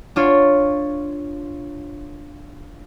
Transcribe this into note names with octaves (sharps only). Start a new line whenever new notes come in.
D4 F4 C#5